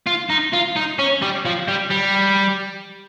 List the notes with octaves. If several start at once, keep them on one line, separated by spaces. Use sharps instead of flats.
F4
D#4
F4
D#4
C#4
G3
F3
G3
G3